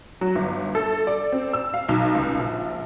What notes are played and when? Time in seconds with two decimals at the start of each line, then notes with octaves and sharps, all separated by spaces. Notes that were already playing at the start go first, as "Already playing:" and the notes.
0.21 F#3
0.35 G1
0.75 A4
1.07 D5
1.32 C4
1.53 E6
1.74 F5
1.89 B1
2.15 C#2
2.39 A#1